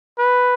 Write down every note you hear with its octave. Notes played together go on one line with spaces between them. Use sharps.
B4